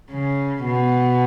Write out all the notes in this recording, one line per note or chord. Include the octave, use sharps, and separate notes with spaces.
C#3
B2